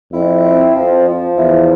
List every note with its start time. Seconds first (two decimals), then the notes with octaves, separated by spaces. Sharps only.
0.13 F2 E4
0.44 C4
0.75 F2 F3
1.07 F3
1.37 E2 E4